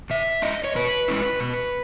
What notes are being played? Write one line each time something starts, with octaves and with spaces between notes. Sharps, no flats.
B2 E5
G#3 C#4 E4 D#5
C#5
B2 B4
G#3 C#4 E4
B2